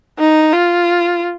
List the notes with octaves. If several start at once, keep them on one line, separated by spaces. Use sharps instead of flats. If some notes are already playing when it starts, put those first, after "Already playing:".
D#4
F4